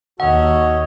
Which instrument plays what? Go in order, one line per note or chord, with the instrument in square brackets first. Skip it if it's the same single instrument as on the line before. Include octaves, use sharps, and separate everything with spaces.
[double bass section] D#2 [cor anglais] F#4 [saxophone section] A4 C#5 D#5 [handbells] F#5